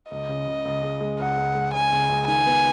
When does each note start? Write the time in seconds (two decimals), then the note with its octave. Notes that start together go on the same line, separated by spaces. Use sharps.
0.11 C#2 D#5
0.29 C#3
0.47 C#3
0.65 C#2
0.83 G#3
1.01 G#3
1.20 C#2 F#5
1.37 C#2
1.55 G#3
1.74 C#3 G#5
1.92 C#2
2.09 C#2
2.28 D#3 G#5
2.46 B3